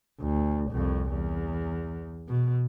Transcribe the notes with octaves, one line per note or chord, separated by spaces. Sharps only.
D2
C2 F2
E2
B2